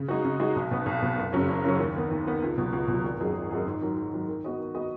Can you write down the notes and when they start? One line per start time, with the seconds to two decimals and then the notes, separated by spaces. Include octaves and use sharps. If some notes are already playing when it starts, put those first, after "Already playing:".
Already playing: C#3
0.08 G#3 D#4 F#4
0.25 C#3
0.40 G#3 D#4 F#4
0.56 B1
0.71 B2 B3
0.86 B1
1.02 B2 B3
1.18 F#1
1.33 F#2 C#3 F#3 C#4
1.49 F#1
1.64 F#2 C#3 F#3 C#4
1.79 D#2
1.96 D#3 B3
2.11 D#2
2.26 D#3 B3
2.42 C#2
2.58 B2 F#3
2.72 C#2
2.88 B2
2.93 F#3
3.03 G#1
3.20 F#2 F#3 D#4 G#4
3.35 G#1
3.51 F#2 F#3 D#4 G#4
3.67 G#2
3.81 D#3 F#3
3.97 G#2
4.13 D#3 F#3
4.28 D#3
4.44 B3 F#4 D#5
4.59 D#3
4.75 B3 F#4 D#5